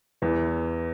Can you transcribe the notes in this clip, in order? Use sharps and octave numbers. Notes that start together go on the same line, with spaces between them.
E2 E3